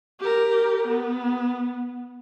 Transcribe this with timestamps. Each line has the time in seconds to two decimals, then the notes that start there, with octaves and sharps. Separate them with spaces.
0.20 G4 A#4
0.87 B3